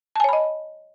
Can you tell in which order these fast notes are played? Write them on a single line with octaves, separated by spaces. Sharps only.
A5 G#5 C#5 B5 D#5